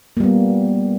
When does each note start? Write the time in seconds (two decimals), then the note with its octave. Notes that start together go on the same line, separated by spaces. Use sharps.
0.17 A#3
0.20 G3
0.24 B3